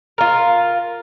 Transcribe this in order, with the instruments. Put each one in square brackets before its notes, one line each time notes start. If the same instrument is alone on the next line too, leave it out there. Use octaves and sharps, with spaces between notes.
[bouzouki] F4 A#4